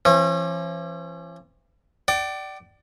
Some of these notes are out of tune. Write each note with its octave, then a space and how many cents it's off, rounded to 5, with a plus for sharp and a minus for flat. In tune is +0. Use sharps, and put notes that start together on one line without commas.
E3 +45 C#4 -40
D5 +10 G5 -40